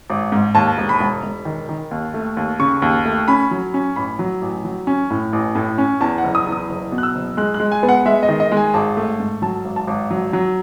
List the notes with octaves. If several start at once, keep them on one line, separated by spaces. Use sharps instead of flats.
G#1
G#2
D#2 A5
E1
B5
E1
E1
D#3
D#3
D#2
A3
D#2
C#3 C#6
D#2
A3
C#4 B5
F#3
C#4
A1 B5
F#3
A1
F#3
C#4
A2
A1
A2
C#4
E2 A5
F#5
F#1
D#6
E2
D#6
F#1
B2
F#6
E6
F#1
G#3 F#6
F#6
G#3
G#5
B3
F#5
G#3 E5
D#5
D#3
D#5
G#3
G#5
G#1 A5
A3
G#2
F#3 A5
G#1
A5
G#1
F#3
F#3